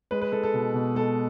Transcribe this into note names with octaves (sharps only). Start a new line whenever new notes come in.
G#3 B4
B4
G#3 A4
A4
B2
B2
G#3 A4